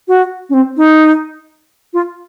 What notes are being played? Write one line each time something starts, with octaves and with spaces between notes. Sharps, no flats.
F#4
C#4
C4
D#4
F4